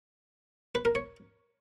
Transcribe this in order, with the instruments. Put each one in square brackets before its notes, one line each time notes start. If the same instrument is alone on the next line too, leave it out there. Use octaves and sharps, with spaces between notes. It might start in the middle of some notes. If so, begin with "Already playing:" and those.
[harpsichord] B4
A#4
C#5